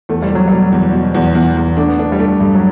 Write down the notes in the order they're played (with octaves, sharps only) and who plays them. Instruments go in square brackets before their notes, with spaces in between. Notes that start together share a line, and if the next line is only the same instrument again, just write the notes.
[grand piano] E2 [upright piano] A3
[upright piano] G3
[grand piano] B2 [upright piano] F#3
[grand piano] B2 [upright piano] G3
[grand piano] E2
B2
E2
E2
E2
[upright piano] A3 [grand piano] D4
[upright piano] B3
[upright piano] A3 [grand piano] D4
[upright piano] G3
[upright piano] A3 [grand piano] D4
[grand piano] G2
[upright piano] F#3